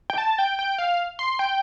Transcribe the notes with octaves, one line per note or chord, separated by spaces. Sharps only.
G5
A5
G5
G5
F5
C6
G5